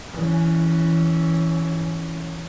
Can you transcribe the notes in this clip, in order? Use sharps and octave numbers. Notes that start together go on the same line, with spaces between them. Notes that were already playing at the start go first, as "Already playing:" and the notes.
E3 C#4